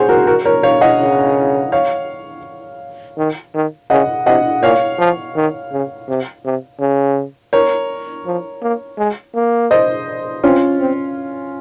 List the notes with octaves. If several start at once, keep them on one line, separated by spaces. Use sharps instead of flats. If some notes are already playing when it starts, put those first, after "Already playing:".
Already playing: G#4 C5 C#5 F#5
F#4 A#4
F#4 A#4
A#4 C#5
C#5 F5
D#5 F#5
C#3
C#5 F5
D#3
D#3
C#3 D#5 F#5
C3 D#5 F#5
A#2 C#5 F5
F3
D#3
C#3
C3
C3
C#3
A#4 C#5
F3
A#3
G#3
A#3
C5 D#5
C4 C#4 F4
C4